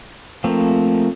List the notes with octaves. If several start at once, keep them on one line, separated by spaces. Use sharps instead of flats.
F3 A3 A#3 C4